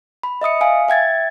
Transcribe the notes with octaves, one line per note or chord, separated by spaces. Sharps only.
B5
D#5 E5 D#6 C#7
F5 G#5
E5 G5 G#6 A6